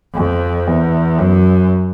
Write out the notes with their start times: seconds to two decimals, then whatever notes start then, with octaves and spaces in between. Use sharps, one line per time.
0.14 F2
0.67 E2
1.19 F#2